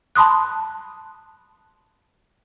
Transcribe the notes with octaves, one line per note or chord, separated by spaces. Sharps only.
A5 B5 C6 D#6 F#6